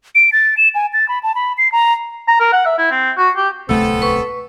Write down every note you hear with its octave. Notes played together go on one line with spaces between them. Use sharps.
D7
A6
E7
G#5
A6
B5
A5
B5
C7
A#5
A#5
A#4
F#5
E5
E4
C4
F#4
G4
D1 C2 A3 B3 C4 A4
B4 C#6